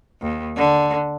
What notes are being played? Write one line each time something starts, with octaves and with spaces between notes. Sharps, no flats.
D#2
D3